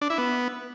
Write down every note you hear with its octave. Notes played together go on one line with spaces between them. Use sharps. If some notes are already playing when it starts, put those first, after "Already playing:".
D4
E4
B3